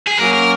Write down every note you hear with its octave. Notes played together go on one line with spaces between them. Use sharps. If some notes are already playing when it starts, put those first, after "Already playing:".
G#4
F#3 A#3 C#4 A#4
A#4